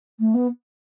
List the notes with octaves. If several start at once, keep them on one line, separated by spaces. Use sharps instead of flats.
A3
B3